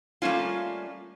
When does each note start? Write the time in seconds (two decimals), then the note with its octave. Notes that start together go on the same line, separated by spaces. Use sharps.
0.22 G3 A3 A#3 C#4 F4